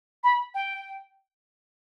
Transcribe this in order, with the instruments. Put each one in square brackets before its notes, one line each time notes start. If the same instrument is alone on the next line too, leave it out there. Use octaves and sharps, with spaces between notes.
[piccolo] B5
G5